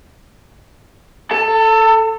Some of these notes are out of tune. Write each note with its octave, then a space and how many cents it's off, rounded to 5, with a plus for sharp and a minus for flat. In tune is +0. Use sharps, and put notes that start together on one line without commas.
A4 +0 A5 +35